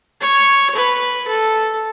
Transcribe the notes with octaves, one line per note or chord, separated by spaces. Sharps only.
C#5
B4
A4